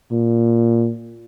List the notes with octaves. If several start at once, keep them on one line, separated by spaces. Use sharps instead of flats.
A#2